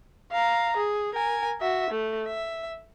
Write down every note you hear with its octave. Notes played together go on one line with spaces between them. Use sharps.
F5 A#5
G#4
A#4 G#5
F#4 E5
A3
E5